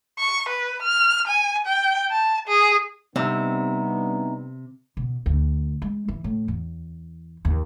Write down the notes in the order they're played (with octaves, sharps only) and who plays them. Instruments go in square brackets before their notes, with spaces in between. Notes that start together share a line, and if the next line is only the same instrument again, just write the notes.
[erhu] C#6
B4
F6
G#5
G5
A5
G#4
[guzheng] C3 [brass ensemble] G3 B3 D4 [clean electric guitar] C4 D#4 E5
[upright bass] B2
D2
G#3
E3
A2
E2
D#2